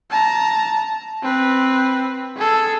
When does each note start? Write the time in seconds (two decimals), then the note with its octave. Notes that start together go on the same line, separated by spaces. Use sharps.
0.10 A5 A#5
1.22 C4 B4
2.36 G#4 A4